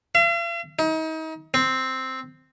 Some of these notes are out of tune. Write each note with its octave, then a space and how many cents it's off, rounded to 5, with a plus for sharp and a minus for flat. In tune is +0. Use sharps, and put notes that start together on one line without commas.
F5 -45
D#4 +35
C4 +0